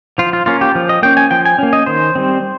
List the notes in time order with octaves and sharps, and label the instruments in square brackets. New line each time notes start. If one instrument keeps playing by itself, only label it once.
[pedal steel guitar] F3 F4
F4
A#3 C#4 F4
G4
F3
D#5
A#3 C#4 G5
G#5
F3 G5
G#5
A#3 C#4
D#5
D#3 C5
G3 C4